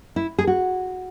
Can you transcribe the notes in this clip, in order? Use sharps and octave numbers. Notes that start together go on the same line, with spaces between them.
E4
G#4
F#4